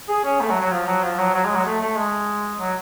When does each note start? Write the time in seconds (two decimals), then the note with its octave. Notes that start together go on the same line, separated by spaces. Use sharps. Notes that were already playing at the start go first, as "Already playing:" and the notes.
0.09 G#4
0.24 C#4
0.40 A3
0.50 F#3
0.61 F#3
0.71 F3
0.87 F#3
1.03 F3
1.18 F#3
1.34 F#3
1.44 G#3
1.55 F#3
1.65 A3
1.81 A3
1.96 G#3
2.59 F#3